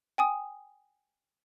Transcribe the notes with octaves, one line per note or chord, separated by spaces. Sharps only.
G5 G#5 D#6